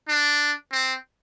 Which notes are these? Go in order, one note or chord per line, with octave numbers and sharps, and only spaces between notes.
D4
C4